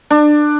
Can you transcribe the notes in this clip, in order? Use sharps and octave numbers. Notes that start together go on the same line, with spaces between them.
D4